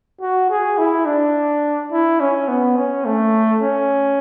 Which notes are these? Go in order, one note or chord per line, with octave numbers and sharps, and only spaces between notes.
F#4
G#4
E4
D4
E4
C#4
B3
C#4
A3
C#4